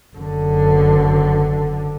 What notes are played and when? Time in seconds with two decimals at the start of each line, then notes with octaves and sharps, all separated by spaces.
0.15 F#1 D3